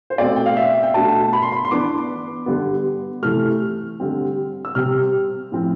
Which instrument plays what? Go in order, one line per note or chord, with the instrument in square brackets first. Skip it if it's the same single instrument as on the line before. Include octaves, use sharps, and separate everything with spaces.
[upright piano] C5
B2 A3 C4 D5
G5
F5
E5
G5
B2 A3 D4 A5
B5
C6
B5
C6
E3 B3 D4 D6
D3 G3 B3
C3 E3 A3 F6
D3 G3 C4
E6
C3 G3 C4 F6
A2 F3 C4